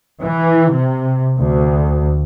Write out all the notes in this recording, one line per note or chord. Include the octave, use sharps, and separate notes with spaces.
E3
C3
D2